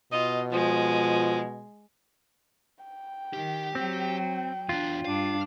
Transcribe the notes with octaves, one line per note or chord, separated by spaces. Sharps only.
B2 F4 D#5
F3 G#3
G5
D#3 G4
F#3 C4
E2 D4 F4
G2 D4 F5